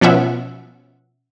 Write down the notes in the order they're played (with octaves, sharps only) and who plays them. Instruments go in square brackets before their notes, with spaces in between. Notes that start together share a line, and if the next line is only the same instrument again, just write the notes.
[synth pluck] B2 F3 C#4 E5 F#5